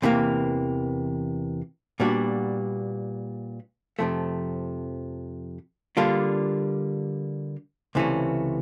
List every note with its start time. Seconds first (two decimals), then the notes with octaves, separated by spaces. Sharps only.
0.02 E2 C3 E3 G3 A#3
2.00 A#2 G3 B3 D4 F#4
3.99 F2 C3 F3 A3
5.97 D3 G3 A#3 D4 F4
7.95 C#2 C3 E3 A3 C#4